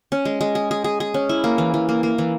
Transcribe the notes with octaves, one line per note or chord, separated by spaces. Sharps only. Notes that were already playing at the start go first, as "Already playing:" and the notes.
C#4
G#3
G#3
G#4
G#4
G#4
G#4
C#4
E4
A#3
E3
E3
A#3
A#3
E3